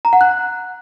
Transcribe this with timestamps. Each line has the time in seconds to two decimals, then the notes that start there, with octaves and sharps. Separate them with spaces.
0.05 A#5
0.13 F#5
0.21 F#6